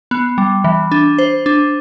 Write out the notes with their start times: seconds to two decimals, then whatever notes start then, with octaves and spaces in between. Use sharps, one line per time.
0.11 B3
0.38 G3
0.64 E3
0.92 D4
1.18 C5
1.46 D4